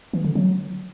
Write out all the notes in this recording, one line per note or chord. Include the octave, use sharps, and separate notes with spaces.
E3
D3
F#3